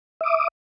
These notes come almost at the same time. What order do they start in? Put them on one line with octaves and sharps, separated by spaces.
E5 D6 D#6